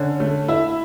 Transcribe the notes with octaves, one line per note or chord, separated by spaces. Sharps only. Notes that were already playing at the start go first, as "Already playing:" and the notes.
Already playing: D3 C#4
A3 A4
E4 E5